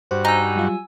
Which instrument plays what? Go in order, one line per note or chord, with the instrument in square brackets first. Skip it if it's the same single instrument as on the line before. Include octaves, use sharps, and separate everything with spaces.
[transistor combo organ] G2 F#4 [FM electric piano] C5
[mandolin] D#4 [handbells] G#5 E6
[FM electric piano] F#3 G3 F4